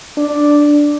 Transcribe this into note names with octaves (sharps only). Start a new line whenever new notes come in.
D4